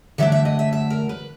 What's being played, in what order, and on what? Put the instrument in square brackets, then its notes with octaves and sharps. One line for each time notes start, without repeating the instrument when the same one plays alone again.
[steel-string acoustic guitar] D3 F#3 A3 D4 E5
E5
D#5
E5
E5
A#4
B4